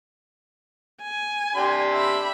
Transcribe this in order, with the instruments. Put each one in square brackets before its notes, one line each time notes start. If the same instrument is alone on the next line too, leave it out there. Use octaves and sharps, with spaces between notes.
[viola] G#5
[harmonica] D4 G4 C6
[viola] E5 B5